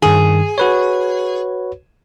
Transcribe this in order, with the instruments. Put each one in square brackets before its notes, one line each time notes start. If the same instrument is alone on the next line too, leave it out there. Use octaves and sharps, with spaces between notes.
[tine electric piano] G2 D#3 [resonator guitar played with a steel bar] G#4
[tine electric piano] F#4 B4 C#5